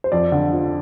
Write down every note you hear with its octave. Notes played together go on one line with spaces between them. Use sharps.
C5
F2 D5
D3
F3